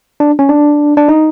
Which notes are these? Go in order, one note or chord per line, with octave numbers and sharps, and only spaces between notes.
D4
C#4
D4
D4
D#4